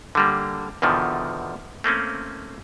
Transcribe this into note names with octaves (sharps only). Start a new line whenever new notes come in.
D3 G3 A#3
E2 B2 D3 D#3 F3
A3 A#3 C4 C#4